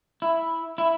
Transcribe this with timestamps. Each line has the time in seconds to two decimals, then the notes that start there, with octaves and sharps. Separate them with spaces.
0.22 E4
0.78 E4